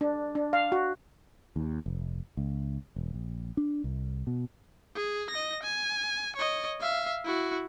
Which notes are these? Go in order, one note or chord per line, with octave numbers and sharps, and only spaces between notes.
D4
D4
F5
F#4
D#2
F1
C#2
E1
A#1
D4
C2
B2
G#4
D#5 A#6
G#5
C#5 D#5
E5 F5
E4 F#4